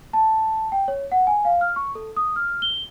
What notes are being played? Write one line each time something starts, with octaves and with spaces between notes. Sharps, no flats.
A5
G5
C#5
F#5
G#5
F5
F6
C#6
A4
D#6
F6
G7